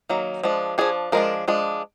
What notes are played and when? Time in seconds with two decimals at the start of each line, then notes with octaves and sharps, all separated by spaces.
0.09 D#3 F#3 A#3
0.43 F3 G#3 D4
0.78 F3 G#3 D4 G#4
1.12 F3 G#3 D4 A#4
1.48 F3 G#3 D4